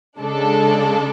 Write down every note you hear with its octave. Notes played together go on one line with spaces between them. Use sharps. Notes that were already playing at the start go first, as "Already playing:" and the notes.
C#3 G#3 D4 A4